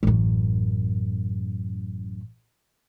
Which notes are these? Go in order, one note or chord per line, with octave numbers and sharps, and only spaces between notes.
A1 F#2